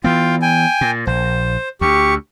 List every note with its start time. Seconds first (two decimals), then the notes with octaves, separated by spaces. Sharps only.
0.04 E3 B3 F4 F5 G5
0.42 G5 G#5
0.81 A#2
1.07 A#1 C5
1.81 D2 G4 C#6